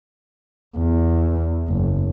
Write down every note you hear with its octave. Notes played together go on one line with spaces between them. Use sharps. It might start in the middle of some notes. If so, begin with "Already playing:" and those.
E2
F#1